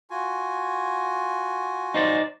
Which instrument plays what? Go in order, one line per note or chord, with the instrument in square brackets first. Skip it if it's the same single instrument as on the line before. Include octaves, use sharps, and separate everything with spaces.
[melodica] F4 F#4 G#5
[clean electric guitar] D#4 C5 D5